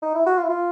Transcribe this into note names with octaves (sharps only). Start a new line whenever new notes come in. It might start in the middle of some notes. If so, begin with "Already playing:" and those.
D#4
E4
F#4
F4
E4
F4